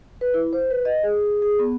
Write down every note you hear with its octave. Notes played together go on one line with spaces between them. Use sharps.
B4
E4
C5
B4
D#5
G#4
G#4
B3